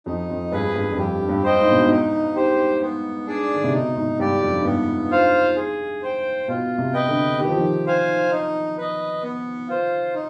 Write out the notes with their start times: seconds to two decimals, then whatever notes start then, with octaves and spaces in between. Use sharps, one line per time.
0.06 F2 D#4
0.30 F2
0.52 G2 G#4 B4
0.75 G2
0.92 F2
0.98 G2 G4
1.29 G2
1.44 C5 D#5 G5
1.59 G#2
1.71 B2
1.82 G#2
1.90 D#4
2.35 G4 C5
2.81 B3
3.27 D4 G#4 D5
3.55 D3
3.64 C3
3.72 B2 D#4
3.96 G#2
4.19 G2 G4 D5
4.42 F2
4.59 G#2
4.64 G2 B3
5.10 F4 C5 F5
5.56 G#4
6.02 C5 G5
6.48 B2 F4
6.78 C3
6.93 B4 D#5 G5
7.09 D3
7.39 D#3 G4
7.49 F3
7.59 D#3
7.86 C5 F5 G#5
8.31 D#4
8.78 B4 D#5
9.23 B3
9.68 F4 C5
10.14 D#4